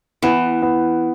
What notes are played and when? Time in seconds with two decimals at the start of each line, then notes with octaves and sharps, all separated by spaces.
0.22 E3 B3
0.62 B3